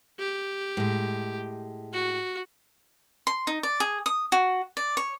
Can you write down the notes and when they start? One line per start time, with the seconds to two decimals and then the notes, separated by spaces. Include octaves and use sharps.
0.19 G4
0.77 A2 G#3
1.93 F#4
3.27 C6
3.47 D#4
3.63 D5
3.80 G#4
4.06 D#6
4.32 F#4
4.77 D5
4.97 C#5